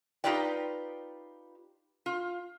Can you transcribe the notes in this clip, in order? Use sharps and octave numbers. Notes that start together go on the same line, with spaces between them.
D#4 F4 G4 B4 D5 G5
F4